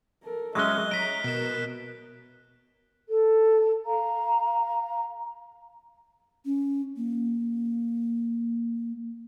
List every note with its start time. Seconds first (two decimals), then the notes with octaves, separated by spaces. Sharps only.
0.24 A4 A#4
0.55 F#3 G#3 C#4 D#5 E5 F#6 G7
0.91 C#5 D#5 A#5 B6 D7
1.24 B2 B3 A#4 E7
3.08 A4
3.86 F5 A#5
6.45 C#4
6.97 A#3